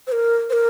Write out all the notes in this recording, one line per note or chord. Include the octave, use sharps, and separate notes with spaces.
C5
A#4
C5
A#4